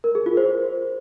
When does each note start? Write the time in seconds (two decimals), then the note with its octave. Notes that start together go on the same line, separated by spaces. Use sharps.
0.04 A#4
0.15 G#4
0.26 F4
0.37 C5